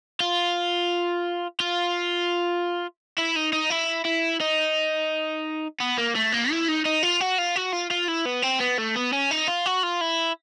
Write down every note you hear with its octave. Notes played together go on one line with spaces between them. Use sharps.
F4
F4
E4
D#4
D#4
E4
E4
D#4
B3
A#3
A3
A#3
E4
D#4
D#4
F4
F#4
F4
F#4
F4
F4
E4
B3
C4
B3
A3
B3
C#4
D#4
F4
F#4
F4
E4